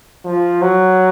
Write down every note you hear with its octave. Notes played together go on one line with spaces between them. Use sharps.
F3
F#3